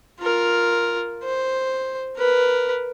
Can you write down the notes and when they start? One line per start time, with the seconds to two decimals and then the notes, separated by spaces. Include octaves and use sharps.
0.20 F4 A#4
1.24 C5
2.17 A#4 B4